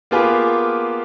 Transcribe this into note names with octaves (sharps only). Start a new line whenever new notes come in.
A#3 B3 F4 G4 G#4 B4